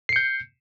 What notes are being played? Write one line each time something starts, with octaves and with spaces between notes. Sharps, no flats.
G6 C7 C#7